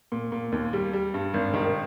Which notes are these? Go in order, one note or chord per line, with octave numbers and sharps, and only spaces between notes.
A#2
A#2
D#2
G3
G3
G2
G#1
D#3